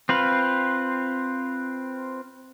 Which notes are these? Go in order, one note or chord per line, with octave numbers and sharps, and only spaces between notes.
C4 F4 B4